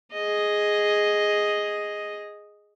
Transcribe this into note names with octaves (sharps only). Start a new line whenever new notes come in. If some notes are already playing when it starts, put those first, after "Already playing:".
G#4 D#5